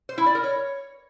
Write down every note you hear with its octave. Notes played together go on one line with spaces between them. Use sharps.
C5
E4
D5
A#4
C#5